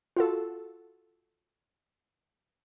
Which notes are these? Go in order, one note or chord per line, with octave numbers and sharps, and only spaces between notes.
F4 F#4 A4